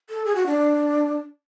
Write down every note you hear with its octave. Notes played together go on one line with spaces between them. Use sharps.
A4
G#4
F#4
D4